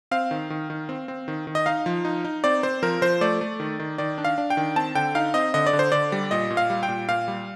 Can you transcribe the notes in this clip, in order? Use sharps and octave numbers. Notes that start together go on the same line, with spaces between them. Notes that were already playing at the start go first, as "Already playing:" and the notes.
C4 F5
D#3
D#3
D#3
C4
C4
D#3
D#3
D#5
D#4 F5
F3
D#4
D#4
C4 D5
C4 C5
F3 A#4
F3 C5
A3 D5
A3
D#3
D#3
D#3 D5
D4
F5
D4
G5
D#3
C4 A5
D3 G5
D#4 F5
C4 D#5
D3 D#5
D5
D3
C5
D3 D5
G3
A#2 D#5
A#2
F5
G3
G5
A#2
A#2 F5
G3